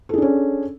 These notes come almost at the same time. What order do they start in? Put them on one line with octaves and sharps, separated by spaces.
A4 G#4 D4 C#4